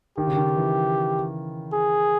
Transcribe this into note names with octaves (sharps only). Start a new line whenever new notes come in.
D#3 G4
C#3
D#3
E3
G#4